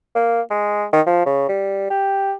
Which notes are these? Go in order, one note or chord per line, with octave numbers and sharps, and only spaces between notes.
A#3
G#3
D#3
F3
C#3
G3
G4